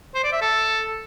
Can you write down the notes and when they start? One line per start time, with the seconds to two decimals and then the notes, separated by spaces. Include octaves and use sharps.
0.15 C5
0.24 D5
0.32 E5
0.41 A4